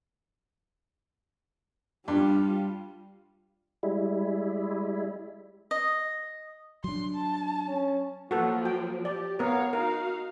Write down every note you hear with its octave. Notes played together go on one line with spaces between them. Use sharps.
G2 G3 F4
G3 G#3 E4
D#5
F#3 D4 C6
A5
C#4
F3 F#3 A#3 F#4 A4 B4
G5
G4 D5
B3 A#4 C#5 F5
D#4 F#4 A#4 F5